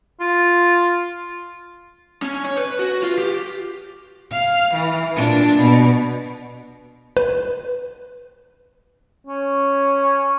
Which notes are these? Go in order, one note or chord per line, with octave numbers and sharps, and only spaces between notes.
F4
C#4
C#5
B4
F#4
F4
G4
F5
E3
A#2 D4
B2
B4
C#4